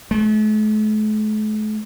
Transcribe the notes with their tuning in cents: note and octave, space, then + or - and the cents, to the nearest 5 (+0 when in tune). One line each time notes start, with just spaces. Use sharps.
A3 -45